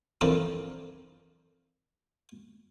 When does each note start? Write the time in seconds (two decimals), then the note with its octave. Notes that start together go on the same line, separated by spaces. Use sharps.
0.21 E3 F3 C4 D4 A4 A#4